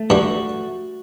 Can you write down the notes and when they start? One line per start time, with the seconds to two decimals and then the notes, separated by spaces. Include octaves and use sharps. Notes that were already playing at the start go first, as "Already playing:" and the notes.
Already playing: A3
0.10 G2 G3 F#4